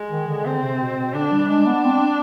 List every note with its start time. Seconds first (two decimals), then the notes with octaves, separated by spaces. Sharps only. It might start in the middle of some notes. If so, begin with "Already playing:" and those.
Already playing: G#3
0.10 D#3
0.27 D3
0.45 D3 C4
0.63 C3
0.80 B2
0.97 B2
1.14 D3 D4
1.32 G3
1.49 G#3 D4
1.67 B3
1.84 C4